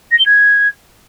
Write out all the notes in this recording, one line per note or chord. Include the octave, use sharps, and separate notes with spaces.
A#6
G7
G#6